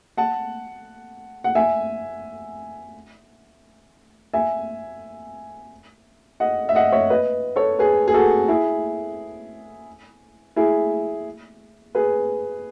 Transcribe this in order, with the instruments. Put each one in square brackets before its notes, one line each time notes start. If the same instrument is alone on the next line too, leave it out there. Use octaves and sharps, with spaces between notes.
[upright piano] F#5 A5
F#5
E5 G#5
E5 G#5
D#5 F#5
E5
D#5 F#5
C#5 E5
B4 D#5
A4 C#5
G#4 B4
G#4
F#4 A4
E4 G#4
E4 G#4
G#4 B4